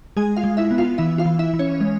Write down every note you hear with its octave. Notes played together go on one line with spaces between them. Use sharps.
G#3 G#4 G#5
F4 F5
G#3
E4 E5
B3
F4 F5
E3 E4 E5
F4 F5
E3
E4 E5
E3
C#4 C#5
G#3